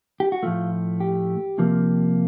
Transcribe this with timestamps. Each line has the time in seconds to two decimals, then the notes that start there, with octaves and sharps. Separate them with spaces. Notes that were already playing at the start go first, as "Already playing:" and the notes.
0.20 G4
0.32 F#4
0.43 A2 F3 A3 F4
1.00 G4
1.58 C3 F3 A#3